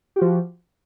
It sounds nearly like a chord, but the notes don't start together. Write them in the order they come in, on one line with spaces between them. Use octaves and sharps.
G4 F#4 F3